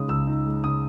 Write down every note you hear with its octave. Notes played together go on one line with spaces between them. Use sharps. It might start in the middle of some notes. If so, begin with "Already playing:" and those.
Already playing: C#3 G#3 D#4 D#6
C#2 E6
D#4
G#3
C#3 D#6